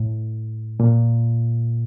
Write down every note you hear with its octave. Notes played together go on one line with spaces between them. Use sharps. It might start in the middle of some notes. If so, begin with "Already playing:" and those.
Already playing: A2
A#2